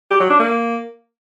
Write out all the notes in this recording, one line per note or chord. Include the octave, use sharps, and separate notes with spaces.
G4
F#3
D4
A#3